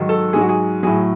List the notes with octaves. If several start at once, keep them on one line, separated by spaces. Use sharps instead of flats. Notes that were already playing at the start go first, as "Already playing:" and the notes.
Already playing: G#2 D#3 F#3
A4
G#2 F#3 G#4
F#4
G#4
A2 F#3 G#4